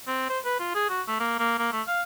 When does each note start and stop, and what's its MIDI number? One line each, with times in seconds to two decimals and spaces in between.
0.07 0.27 60
0.29 0.39 72
0.45 0.56 71
0.59 0.72 65
0.75 0.89 68
0.89 1.02 66
1.08 1.16 57
1.20 1.35 58
1.39 1.55 58
1.59 1.70 58
1.72 1.82 57
1.88 2.02 77